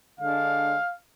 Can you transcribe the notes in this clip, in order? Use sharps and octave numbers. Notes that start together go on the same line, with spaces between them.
D3 G#3 D4 F5